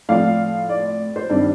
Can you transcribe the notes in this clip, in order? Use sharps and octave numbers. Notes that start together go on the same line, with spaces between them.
A2 F3 C4 D5 F5
D5
C5
G2 D#3 G3 C4 D5